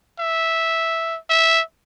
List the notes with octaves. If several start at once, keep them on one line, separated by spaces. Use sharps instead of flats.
E5
E5